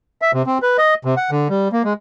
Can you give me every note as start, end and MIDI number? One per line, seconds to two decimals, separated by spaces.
0.22 0.31 76
0.34 0.42 48
0.46 0.58 60
0.62 0.77 71
0.78 0.94 75
1.05 1.15 48
1.17 1.30 78
1.31 1.48 50
1.50 1.68 55
1.72 1.82 58
1.84 1.93 56